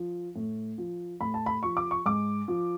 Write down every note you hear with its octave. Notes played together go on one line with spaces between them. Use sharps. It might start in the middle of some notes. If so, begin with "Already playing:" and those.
Already playing: F3
A2
F3
A2 B5
A5
B5
F3 C#6
D6
C#6
G#2 D6
F3